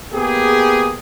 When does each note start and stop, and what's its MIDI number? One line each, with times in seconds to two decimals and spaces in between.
0.14 0.98 58
0.14 0.98 59
0.14 0.98 67
0.14 0.98 68